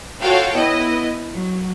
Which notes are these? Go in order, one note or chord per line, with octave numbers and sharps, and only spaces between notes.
F4 F#4 A4 C#5 F5 G5
B3 E4 D#5
F#3